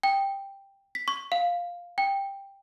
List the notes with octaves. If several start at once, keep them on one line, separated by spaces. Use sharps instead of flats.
G5
B6
C#6
F5
G5